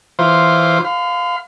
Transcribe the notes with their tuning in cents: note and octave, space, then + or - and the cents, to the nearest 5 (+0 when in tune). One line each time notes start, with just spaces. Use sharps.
E3 +0 F4 +0 C5 +0
F5 +10 C6 -45